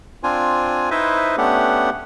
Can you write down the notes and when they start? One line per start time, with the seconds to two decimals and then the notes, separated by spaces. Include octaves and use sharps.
0.23 C4 D4 F4 G#5
0.91 D#4 E4 B4 C5 D#5 E5
1.38 A3 B3 C#4 D4 G4 F#5